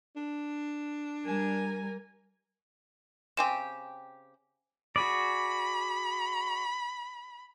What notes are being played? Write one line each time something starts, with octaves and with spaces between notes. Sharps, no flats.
D4
G3 A#4 G#5
C#3 C4 G4 G#5 E7
F#4 G#4 D5 B5